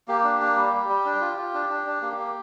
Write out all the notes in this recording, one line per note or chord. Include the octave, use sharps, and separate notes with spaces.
A#3 G4
D4
A#3
G3
G3
G3
D4
F4
F4
D4
D4
D4
A#3 G4
A#3